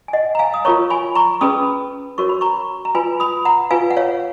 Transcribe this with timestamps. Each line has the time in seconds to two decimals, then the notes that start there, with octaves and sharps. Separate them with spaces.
0.08 G#5
0.13 D#5 F#5
0.35 A#5
0.39 F5 G#5
0.54 D#6
0.65 F4 A#4 C#5 A#5 C#6
0.90 G#5 B5
1.15 A#5 C#6
1.41 C#4 G#4 B4 B5 D#6
2.18 F#4 A#4 C#5 C#6
2.29 B5
2.41 A#5 C#6
2.85 A#5
2.95 F4 B4 G#5 B5
3.20 B5 D#6
3.45 F#5 A#5
3.71 F4 B4 F5 G#5
3.91 F#5
3.97 C#5 F5